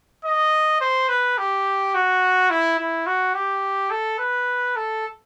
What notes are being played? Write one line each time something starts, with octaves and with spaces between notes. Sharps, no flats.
D#5
C5
B4
G4
F#4
E4
E4
F#4
G4
A4
B4
A4